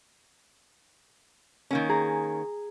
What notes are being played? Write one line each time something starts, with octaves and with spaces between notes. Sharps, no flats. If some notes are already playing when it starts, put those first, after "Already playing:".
D#3 A#3 C#4
G#4 A#5